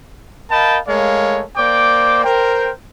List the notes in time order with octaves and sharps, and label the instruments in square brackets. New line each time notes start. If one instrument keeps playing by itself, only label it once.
[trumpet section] A#4 D#5 F5 G5 A5 B5
G#3 A3 A#4 C#5 F5
A#3 C5 D5 G5 D6
A#4 C5 G5